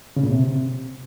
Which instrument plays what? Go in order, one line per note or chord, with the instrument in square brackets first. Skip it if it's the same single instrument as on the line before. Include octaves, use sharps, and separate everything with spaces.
[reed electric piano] C#3
A#2
C3